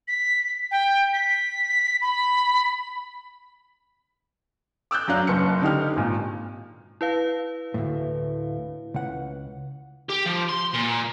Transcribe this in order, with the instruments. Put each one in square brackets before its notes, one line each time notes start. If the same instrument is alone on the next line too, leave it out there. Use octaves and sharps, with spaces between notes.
[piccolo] B6
G5
B6
B5
[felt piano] D6 E6 F#6 G6
F#2 F#3 D4 F5 F#6
F#1 C#7
D3 D#4 G4 F6
G#1 A#2
[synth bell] E4 B4 F5
[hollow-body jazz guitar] D2 A2
C#2 F#5
[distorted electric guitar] G4
F3
C6
A#2